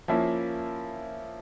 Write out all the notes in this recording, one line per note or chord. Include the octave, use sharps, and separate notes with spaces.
F3 A#3 C#4 E4